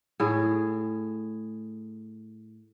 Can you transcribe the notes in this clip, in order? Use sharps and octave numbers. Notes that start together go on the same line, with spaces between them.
A2 G#4